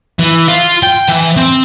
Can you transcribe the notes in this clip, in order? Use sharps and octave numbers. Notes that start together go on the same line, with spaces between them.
E3
F4
G5
E3
C4